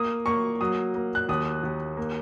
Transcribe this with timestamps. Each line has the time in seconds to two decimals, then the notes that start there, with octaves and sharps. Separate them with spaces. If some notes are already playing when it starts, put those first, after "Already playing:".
Already playing: A#3 D#6
0.26 A#3 C#6
0.61 F#3 D#6
0.95 A#3
1.15 F#6
1.29 D#2 D#6
1.63 D#2
1.97 A#3